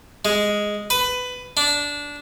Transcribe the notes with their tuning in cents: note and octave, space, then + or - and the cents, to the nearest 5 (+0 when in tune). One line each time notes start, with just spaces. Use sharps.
G#3 +0
B4 +15
D4 -15